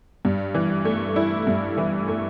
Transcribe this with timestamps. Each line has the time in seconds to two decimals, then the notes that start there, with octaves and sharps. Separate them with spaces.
0.25 G2
0.55 E3
0.85 A3
1.16 E4
1.47 G2
1.78 E3
2.08 A3